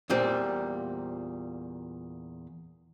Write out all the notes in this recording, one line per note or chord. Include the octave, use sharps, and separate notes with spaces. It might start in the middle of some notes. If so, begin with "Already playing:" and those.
E2 A#2 G3 C4